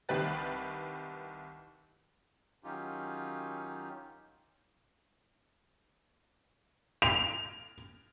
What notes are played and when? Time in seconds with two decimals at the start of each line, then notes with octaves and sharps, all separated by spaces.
0.09 C2 D#3 G4 B4 A6
2.64 D#3 F#3 C#4 D#4 F4 G4
7.02 F7